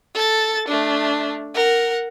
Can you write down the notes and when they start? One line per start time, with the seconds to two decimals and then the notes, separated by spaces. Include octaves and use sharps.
0.15 A4 A6
0.68 A3 D4
1.55 A#4 F#5